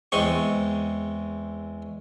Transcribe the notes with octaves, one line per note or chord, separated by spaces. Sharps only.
E2 G#3 C4 C#6